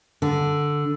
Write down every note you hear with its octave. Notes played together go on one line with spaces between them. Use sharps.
D3